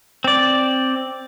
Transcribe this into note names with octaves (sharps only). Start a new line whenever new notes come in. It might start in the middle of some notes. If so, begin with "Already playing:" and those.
C4 D5